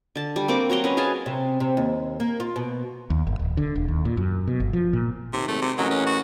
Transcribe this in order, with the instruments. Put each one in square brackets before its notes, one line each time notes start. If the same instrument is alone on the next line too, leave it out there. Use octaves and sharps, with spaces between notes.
[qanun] D3 A5
G3
A#3 C4 F#4 D6
F#3 F#4 A#5 C6
C#4 B4 D#5
G#4 F5 G#5 A5
[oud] C3
C3
D#2
A#3
F4
B2
[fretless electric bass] D#2
G1
D1
D3
E1
D#2
A#2
F#2
B2
G1
F3
A#2
[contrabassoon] D#2 [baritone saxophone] C3
[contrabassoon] G#1 [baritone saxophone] A3
[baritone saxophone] C3
[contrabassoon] A1 [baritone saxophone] F#3 [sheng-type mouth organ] A#4 D#5 F#5
[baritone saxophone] C#4
F#4